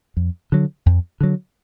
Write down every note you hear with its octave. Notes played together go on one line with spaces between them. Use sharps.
F2
D3 F#3
F2
D3 F#3